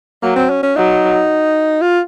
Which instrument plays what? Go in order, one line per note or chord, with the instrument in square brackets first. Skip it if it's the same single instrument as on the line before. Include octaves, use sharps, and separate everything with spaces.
[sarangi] F#3 [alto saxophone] A#3
[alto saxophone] C4
C#4
C#4
[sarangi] F#3 [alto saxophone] D#4
[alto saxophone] F4